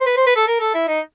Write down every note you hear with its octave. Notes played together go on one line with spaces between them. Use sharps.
C5
B4
C5
B4
A4
A#4
A4
E4
D#4